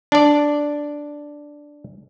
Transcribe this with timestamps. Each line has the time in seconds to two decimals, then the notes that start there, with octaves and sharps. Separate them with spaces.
0.12 D4 D5